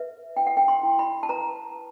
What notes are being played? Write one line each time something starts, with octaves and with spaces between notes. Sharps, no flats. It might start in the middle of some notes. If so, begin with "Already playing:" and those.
Already playing: B4 E5
E4 G5
F#5
G5
C6
E4
B5
A5
B4 A#5